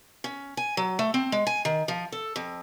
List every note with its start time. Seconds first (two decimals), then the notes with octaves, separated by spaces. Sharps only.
0.24 C#4
0.57 G#5
0.77 F#3
0.99 A3
1.14 C4
1.32 G#3
1.47 G#5
1.65 D#3
1.88 F3
2.12 A4
2.36 F2